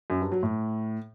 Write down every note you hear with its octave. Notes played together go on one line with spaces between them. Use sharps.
F#2
G2
F#3
A2